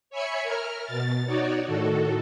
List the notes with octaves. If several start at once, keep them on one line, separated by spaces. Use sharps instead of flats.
C#5 E5 G#5 B5 C#7
A#4 F6
B2 A6
D#4 F#4 C#5 D5
A2 D#3 F#4 A4